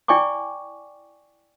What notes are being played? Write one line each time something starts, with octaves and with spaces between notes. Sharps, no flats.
E4 D5 G5 G#5 C#6 D6